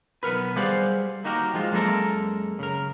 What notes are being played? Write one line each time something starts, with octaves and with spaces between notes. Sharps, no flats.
B1 B3 A#4 B4
G3 G#4 C5 D5 F5 F#5
A#3 D#4 F#4 G4 A#4
F3 G#3 F4
F#2 G#3 A#3 A4 A#4
C#3 A#4